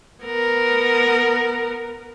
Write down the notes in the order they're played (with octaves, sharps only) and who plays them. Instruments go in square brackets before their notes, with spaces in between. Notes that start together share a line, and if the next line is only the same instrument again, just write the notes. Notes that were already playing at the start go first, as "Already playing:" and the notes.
[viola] B3 A#4